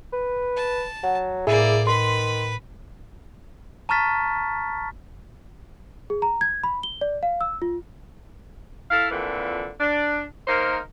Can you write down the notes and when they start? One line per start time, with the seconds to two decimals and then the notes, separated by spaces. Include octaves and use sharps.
0.13 B4
0.57 A5
1.04 F#3 F#5
1.47 A2 A#3 E4 G#4 D5
1.87 D#3 B4 B5 C6
3.89 A5 A#5 C#6 F6 A6 B6
6.10 G#4
6.22 A#5
6.41 G#6
6.64 B5
6.83 G7
7.01 D5
7.23 F5
7.41 E6
7.62 F4
8.91 E4 A4 F5
9.11 F2 A#2 D3 E3
9.80 D4
10.48 A#3 D#4 A#4 C5